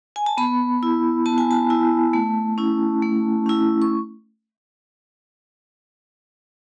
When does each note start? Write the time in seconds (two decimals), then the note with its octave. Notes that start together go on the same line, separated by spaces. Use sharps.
0.16 G#5
0.26 A5
0.37 B3 B5
0.83 E4
1.26 B3 A5
1.38 G#5
1.51 A5
1.70 E4
2.13 A3
2.58 C#4 E4
3.02 A3
3.46 C#4 E4
3.82 C#6